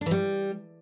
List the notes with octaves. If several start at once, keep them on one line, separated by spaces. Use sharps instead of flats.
D4
E3
G3